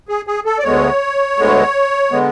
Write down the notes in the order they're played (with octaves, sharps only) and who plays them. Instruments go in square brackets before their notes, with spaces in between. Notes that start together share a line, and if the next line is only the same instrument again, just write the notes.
[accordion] G#4
G#4
A4
D5
D2 D3 G#3 B3 C#5
D2 D3 G#3 B3
D3 G#3 B3